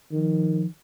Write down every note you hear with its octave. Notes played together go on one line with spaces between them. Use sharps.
D#3 F3